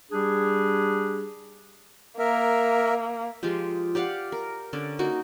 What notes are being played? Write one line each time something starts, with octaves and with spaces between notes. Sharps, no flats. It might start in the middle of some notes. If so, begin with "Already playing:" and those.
G3 D4 G4 G#4
A#3 A#4 E5
F3 G#3 F4 G4
G4 D5 F5 F#5
A#4
D3 C#4 D5
A#3 D#4 F#4